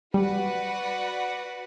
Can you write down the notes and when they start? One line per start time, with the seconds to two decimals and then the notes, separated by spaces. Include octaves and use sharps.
0.14 G3 F#4 B4 D5 F#5